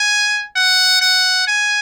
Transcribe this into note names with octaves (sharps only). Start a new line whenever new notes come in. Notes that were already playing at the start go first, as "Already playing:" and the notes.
Already playing: G#5
F#5
F#5
G#5